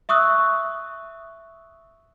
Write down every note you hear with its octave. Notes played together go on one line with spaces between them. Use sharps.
E5 C#6 D#6 E6 F#6